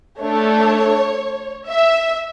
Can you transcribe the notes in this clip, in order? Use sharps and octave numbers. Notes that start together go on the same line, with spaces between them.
A3 D4 A4 C#5
E5